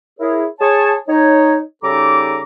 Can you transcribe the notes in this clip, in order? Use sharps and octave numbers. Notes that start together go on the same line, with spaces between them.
E4 G#4 A#4 C#5
G#4 C#5 A5
D#4 C#5
C#3 G3 D#4 A4 A#5 D6